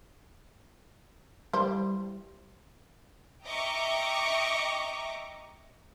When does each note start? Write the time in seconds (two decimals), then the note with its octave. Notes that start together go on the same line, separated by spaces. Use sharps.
1.53 E3 G3 C5
3.45 D#5 E5 G5 A#5 C#6 D6